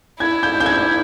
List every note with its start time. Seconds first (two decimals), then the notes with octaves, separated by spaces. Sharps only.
0.20 E4 G#6
0.43 G6
0.60 G6
0.66 G#6